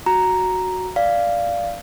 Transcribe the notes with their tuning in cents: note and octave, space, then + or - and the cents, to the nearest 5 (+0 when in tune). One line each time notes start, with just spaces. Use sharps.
F#4 +0 A#5 +0
D5 +0 F5 -10